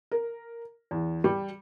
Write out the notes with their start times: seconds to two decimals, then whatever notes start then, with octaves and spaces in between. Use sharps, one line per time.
0.11 A#4
0.91 E2
1.24 G3